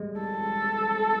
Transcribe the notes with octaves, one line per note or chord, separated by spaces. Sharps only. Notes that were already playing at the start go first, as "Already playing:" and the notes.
Already playing: G3 G#3
A4